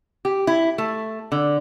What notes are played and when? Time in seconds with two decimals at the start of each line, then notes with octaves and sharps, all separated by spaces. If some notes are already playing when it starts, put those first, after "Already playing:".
0.25 G4
0.47 E4
0.78 A3
1.32 D3